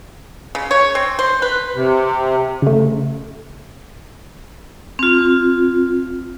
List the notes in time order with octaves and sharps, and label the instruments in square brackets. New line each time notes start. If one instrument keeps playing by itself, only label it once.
[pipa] C#3
C#5
C4
C5
B4
[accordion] C3
[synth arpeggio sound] C#3 A3
[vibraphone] C4 F4